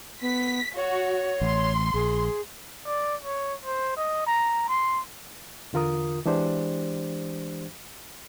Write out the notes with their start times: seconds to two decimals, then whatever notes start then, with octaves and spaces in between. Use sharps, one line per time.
0.22 B3 B6
0.77 F#4 C#5
1.41 A1 C6
1.94 A#1 G#4
2.86 D5
3.25 C#5
3.65 C5
3.97 D#5
4.26 A#5
4.69 C6
5.73 E2 D3 F4 A#4 D#6
6.26 E3 G#3 D4 G4 C5 D5